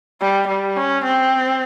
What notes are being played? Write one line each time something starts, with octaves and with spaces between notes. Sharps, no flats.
G3
G3
C#4
C4